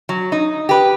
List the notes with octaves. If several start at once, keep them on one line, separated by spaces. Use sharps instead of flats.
F#3
D#4
G4 B4